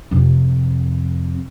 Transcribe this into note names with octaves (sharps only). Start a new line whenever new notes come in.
F2 C3